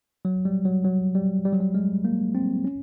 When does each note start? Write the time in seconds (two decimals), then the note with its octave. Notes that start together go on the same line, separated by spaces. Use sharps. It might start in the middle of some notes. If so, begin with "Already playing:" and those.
0.25 F#3
0.45 G3
0.65 F#3
0.85 F#3
1.15 G3
1.45 G3
1.52 F#3
1.60 G3
1.74 G#3
2.05 A#3
2.35 C4
2.65 C#4